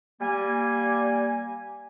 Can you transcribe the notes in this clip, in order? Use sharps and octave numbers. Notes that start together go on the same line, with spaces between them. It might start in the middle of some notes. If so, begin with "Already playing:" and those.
G3 A#3 G#5